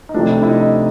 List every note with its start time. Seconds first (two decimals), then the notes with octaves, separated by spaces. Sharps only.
0.09 D#4
0.14 C3 F3 A3 D4
0.43 E4
0.49 D#4